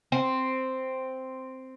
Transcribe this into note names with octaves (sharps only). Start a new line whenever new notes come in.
C4